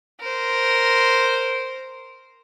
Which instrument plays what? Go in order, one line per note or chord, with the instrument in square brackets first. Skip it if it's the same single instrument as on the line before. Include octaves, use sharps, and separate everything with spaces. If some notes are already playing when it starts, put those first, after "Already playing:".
[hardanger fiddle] A#4 C5